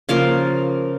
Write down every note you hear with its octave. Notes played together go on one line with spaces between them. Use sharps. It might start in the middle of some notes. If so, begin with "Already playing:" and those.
C#3 F3 A#3 F5